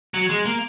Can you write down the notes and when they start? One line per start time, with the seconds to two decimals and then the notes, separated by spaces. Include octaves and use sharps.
0.14 F#3
0.29 G#3
0.45 A#3